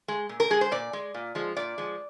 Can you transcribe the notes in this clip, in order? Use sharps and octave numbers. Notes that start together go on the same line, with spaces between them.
G#3
A#2
A#4
G#3 G#4
C5
A#2 D5
G#3
A#2
F3 G#3
A#2 D5
F3 G#3